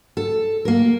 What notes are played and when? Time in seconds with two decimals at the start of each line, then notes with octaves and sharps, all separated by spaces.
0.17 A4
0.65 A#3 A#4